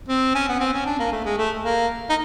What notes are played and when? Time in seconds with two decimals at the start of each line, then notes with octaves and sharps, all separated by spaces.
0.09 C4
0.35 C#4
0.49 B3
0.60 C4
0.73 C#4
0.86 D4
1.00 A#3
1.12 A3
1.25 G#3
1.38 A3
1.64 A#3
2.10 D#4